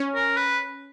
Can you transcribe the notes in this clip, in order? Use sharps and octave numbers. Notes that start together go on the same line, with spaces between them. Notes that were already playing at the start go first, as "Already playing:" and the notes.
Already playing: C#4
A#4
B4